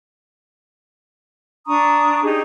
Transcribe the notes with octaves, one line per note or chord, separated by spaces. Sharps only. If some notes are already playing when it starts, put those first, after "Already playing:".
D4 A#5 C#6 D#6
D#4 G4 G#4